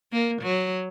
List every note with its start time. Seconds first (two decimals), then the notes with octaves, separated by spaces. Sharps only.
0.12 A#3
0.42 F#3